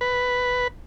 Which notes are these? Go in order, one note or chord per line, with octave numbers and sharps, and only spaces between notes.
B4